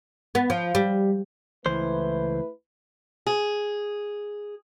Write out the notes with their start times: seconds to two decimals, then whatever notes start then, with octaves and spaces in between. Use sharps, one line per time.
0.35 B3
0.50 F3
0.75 G3
1.66 C#2 E3 A3 E4 B4 C5
3.27 G#4